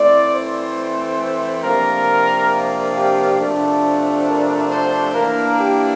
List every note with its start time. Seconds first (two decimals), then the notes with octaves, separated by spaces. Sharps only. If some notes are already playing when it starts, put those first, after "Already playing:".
Already playing: E3 A3 C4 D5
0.32 C5
1.64 C3 F3 A#3 D4 A#4
2.95 G4
3.39 C3 F3 A3 D4
4.27 A#4
4.70 C5
5.14 E3 A#3 D4 A#4
5.57 G4